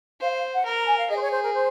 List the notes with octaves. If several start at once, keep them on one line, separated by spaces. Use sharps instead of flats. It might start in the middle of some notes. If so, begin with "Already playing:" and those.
C5 F5
F5
F#5
A#4 A#5
A#5
G#5
F5
G#4 D#5
C5
C#5
C5
A#4
C5